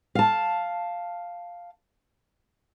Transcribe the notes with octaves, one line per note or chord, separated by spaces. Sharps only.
F5 A5